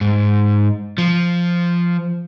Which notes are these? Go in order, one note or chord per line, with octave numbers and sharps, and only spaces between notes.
G#2
F3